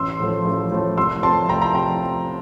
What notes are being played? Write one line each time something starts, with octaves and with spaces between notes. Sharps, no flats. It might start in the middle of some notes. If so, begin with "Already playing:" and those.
Already playing: A1 C6 E6
A2 F3 A3
A1
A2 F3 A3
C2 C6 E6
C3 F3 A3 A5 C6
C2 G5 A#5
G5 A#5
C3 F3 G5 A#5